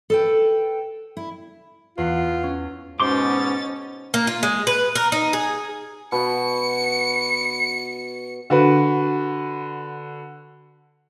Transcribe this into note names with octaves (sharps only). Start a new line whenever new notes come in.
A4 B4 G5
E4
E2 F4 F#5 C7
C#4
G#2 B2 C#4 C5 C6 D6 A6
A#3
F4
G#3
B4
A#4
D#4
G#4
B2 F#4 C#7
D3 F#4 B4